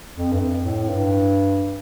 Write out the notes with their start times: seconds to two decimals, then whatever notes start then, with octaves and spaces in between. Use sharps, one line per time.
0.17 F2
0.32 G2
0.40 F2
0.65 A2
0.89 G2